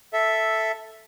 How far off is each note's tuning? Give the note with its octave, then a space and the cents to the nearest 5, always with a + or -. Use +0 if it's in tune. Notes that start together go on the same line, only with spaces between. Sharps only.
A4 +0 E5 +0